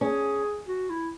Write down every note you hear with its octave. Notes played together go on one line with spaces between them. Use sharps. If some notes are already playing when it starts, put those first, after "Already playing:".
C#4 G#4
F#4
E4